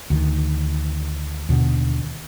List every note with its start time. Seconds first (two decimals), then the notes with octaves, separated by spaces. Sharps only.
0.10 D2 D#3
1.49 D#2 B2 D3